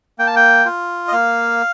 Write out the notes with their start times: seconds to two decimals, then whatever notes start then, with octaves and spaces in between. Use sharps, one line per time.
0.19 A#3 G5
0.27 A5
0.36 G5
0.65 F4
1.08 D#5
1.12 A#3 F5